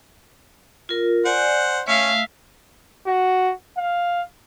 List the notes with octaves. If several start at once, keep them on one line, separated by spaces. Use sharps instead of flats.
F4 A#4
C5 D5 F#5 G#5
A3 C#4 E5 F5
F#4
F5